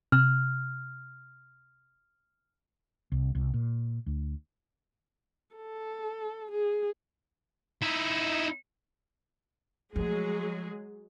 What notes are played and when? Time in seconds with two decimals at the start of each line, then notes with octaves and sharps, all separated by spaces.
0.12 C3 F6
3.12 C2
3.35 C2
3.54 A#2
4.06 D2
5.56 A4
6.51 G#4
7.82 D#4 E4
9.96 F3 F#3 G#3 A3 G#4